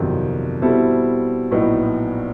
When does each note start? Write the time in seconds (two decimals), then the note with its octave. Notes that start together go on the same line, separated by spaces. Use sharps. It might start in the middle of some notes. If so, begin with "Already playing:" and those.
Already playing: G1 F2 C3 D#3 F#3
0.62 B2 G3 C4 E4 A4
1.51 A#1 A2 F#3 B3 D#4